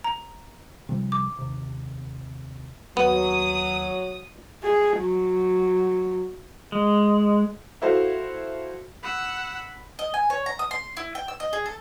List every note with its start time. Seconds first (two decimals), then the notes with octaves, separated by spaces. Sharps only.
0.04 A#5
0.89 C3 F3 G3
1.12 D6
1.39 D#2 C3
2.97 D#2 F#3 B3 D#6
4.63 G#4
4.98 F#3
6.72 G#3
7.82 E4 F#4 A4 C5 F5
9.03 F#5 B5 E6
9.99 D#5
10.14 G#5
10.30 C#5
10.46 A#5
10.59 D#6
10.71 C6
10.97 E4
11.15 G5
11.28 E6
11.40 D#5
11.53 G#4
11.66 A4